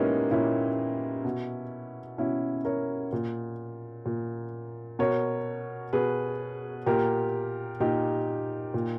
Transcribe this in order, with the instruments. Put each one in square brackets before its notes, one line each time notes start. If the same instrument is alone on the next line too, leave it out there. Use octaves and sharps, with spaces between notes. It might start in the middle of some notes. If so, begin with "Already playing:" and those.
Already playing: [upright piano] A#2 G#3 A#3 B3 C#4 D#4 E4 G4
A#2 C#4 E4
B2
B2 C#4 E4
A#4 C#5
A#2
A#2
B2 A#4 C#5
B2 G#4 B4
A#2 G4 A#4
A#2 D#4 G4
A#2